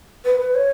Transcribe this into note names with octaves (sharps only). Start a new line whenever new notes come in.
B4
B4
C#5